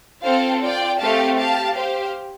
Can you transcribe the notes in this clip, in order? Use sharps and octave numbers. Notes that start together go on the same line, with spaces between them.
C4 F4 A4 C5 F5
F4 D5 G5
A3 C4 G4 F5 A5
G4 F5 A5
G4 C5 F5